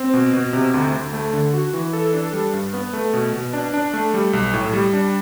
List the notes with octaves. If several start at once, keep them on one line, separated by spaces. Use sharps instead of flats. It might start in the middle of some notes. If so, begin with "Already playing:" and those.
Already playing: C4
B2
B2
C3
D2
D2
A3
D3
F#4
E3
A4
D4
G3
G2
B3
A3
B2
B2
D4
D4
A3
G3
B1
A2
G3
D4